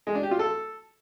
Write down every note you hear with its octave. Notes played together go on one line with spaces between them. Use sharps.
G#3
D4
G4
F4
A4